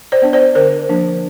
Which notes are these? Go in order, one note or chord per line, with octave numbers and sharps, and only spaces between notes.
C5 D5
B3 D4
C5 D5
D3 A#4 C5
F3 A#3 D4